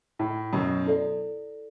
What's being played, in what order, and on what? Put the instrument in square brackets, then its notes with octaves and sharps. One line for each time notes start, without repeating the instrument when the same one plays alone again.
[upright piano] A2
F#2 B2
[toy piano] E4 A4 D5